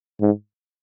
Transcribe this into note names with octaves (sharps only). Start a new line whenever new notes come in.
G#2